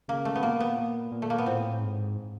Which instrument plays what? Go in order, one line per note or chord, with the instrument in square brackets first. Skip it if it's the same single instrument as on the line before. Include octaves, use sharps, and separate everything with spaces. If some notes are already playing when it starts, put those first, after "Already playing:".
[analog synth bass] C#3 [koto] A#3
[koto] A3
B3
[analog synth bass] A#2 [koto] A#3
[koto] B3
[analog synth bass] A#2
A#2
[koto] A3
A#3
B3
[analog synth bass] A2 [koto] C4
[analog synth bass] G#2